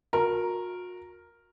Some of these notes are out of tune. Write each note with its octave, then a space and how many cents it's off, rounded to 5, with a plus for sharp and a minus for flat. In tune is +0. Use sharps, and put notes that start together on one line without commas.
F#4 -40 A#4 +0